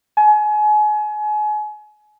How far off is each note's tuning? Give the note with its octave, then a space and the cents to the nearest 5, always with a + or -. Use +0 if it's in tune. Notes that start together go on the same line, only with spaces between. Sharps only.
G#5 +30